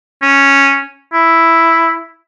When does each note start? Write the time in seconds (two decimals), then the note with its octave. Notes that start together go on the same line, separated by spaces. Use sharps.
0.22 C#4
1.13 E4